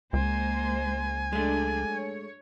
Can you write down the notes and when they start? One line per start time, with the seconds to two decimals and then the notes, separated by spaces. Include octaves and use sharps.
0.13 C#2 G#3 A#3 C5 G#5
1.33 F#3 G#3 A3 D4
1.91 C#5